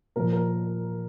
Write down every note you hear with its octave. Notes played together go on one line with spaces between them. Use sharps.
A#2 F3 A#4
A#4